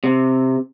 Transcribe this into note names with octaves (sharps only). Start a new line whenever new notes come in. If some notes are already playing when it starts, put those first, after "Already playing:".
C3